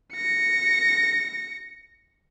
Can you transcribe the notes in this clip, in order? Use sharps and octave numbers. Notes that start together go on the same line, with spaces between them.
A#6 C#7